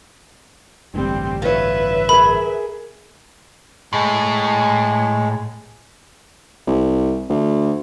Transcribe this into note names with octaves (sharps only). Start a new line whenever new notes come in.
A1 D2 G2 G3 C4
F4 B4 C#5 E5
G#4 A#4 B5
A2 G#3
C2
D2